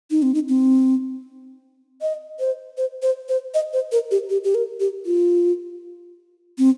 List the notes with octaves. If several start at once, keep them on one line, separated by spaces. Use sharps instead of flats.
D#4
C4
D#4
C4
D#5
C5
C5
C5
C5
D#5
C5
A#4
G4
G4
G4
A#4
G4
F4
C4